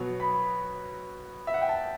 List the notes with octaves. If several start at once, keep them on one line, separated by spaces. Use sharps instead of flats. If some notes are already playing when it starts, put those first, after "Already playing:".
Already playing: B2 F#3 B3
B5
E5
F#5
G5
A5